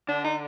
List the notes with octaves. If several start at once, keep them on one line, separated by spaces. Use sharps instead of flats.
D3 D4
D#4